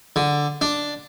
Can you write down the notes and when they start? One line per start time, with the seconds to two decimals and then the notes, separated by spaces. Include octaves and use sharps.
0.16 D3
0.61 D4